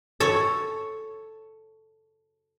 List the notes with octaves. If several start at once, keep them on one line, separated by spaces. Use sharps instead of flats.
A4 C#5